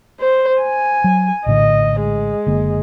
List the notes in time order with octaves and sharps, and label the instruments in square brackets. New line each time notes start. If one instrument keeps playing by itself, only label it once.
[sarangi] C5
G#5
[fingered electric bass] F#3
[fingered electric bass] A#1 A2 D3 [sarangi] D#5
[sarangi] G#3
[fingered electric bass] F#1 D3 A#3